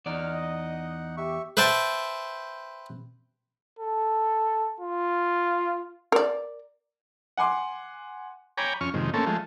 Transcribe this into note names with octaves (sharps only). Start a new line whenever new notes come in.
E2 D#4 D5 F#5 F6
D#5
G4 E5 C#6
B4 C5 E5 G5 A5
A4
F4
A#4 D5
F#5 G#5 C6 D6
C#5 G5 G#5 A#5 B5 D6
F2 C#4 C#6 F6
F2 G#2 C3 D#3
A3 A#3 C4 C#4 A4
F3 G#3 A3